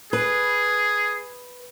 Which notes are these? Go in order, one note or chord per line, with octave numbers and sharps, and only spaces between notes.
G#4 B4